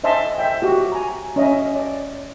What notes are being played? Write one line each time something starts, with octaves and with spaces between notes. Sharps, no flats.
C5 D#5 E5 G#5 A5 C6
E5 G5
F#4 G4
G#5 A#5
C#4 D#5 E5
D5